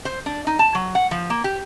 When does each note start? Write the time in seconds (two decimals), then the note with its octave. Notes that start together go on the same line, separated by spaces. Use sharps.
0.05 C5
0.26 D4
0.47 D#4
0.59 A5
0.75 F#3
0.95 F#5
1.11 F3
1.30 A#3
1.44 G4